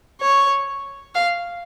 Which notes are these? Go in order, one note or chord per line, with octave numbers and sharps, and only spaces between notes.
C#5
F5